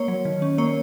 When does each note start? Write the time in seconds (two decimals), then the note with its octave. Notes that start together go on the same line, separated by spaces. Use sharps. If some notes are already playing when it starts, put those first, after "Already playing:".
Already playing: A#3 C#5
0.08 F#3
0.25 D#3
0.42 C#4
0.58 A#3 C#5